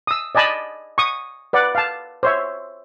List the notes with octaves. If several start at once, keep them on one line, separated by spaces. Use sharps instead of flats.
D#6 E6
D5 D#5 G#5 A5 B5
C#6 D#6
B4 D5 F#5
F5 A5
C5 C#5 E5